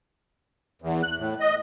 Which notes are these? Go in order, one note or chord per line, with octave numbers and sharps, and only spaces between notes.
E2
F#6
A2
D#5